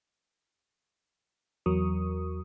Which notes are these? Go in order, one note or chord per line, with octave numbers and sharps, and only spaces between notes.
E2 F#3 A#4 C#6 D#6